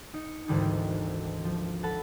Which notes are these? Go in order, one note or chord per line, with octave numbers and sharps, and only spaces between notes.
D#4 C#7
G#1 D2 E3 G3 D4 D#4
F3
A4 F#5 A5 B5